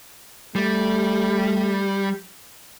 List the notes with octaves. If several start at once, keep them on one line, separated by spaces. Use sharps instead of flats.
G3 A3